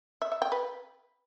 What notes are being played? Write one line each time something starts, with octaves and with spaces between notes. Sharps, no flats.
E5
E5
G5
B4